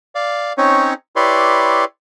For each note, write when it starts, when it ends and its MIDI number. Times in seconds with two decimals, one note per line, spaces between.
0.15 0.53 74
0.15 0.53 77
0.58 0.94 60
0.58 0.94 61
0.58 0.94 63
0.58 0.94 73
1.16 1.85 64
1.16 1.85 67
1.16 1.85 71
1.16 1.85 73
1.16 1.85 74
1.16 1.85 84